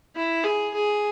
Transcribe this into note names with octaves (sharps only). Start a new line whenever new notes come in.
E4
G#4
G#4